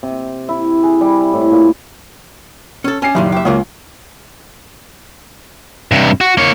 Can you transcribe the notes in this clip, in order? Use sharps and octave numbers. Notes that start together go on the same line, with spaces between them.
C3
E4
G#4
G3
A2
A#2
C#4 A4
C#4 D4 G#5 C7
F#1 A#2 D#3 G3
G4 E5
C#2 C#3 F#3 A#3
G2 C3
F#4
A#3 C#5